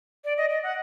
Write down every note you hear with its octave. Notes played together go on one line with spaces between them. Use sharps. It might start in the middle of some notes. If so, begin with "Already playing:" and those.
D5
D#5
D#5
F#5